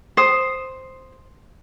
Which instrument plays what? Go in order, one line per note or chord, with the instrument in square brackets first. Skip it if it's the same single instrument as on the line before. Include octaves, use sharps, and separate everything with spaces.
[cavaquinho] C5 D#6